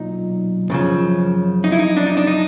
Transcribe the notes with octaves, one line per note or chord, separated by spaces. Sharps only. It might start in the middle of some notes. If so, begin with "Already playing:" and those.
Already playing: B1 A#2 F#3 D#4
F#2 C#3 F3
D#4
E4
D#4
D4
D#4
D4
D#4